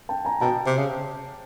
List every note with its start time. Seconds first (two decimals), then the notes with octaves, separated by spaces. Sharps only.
0.09 G5 A5
0.25 G#5 A#5
0.41 B2 G5 A5
0.66 C3
0.77 C#3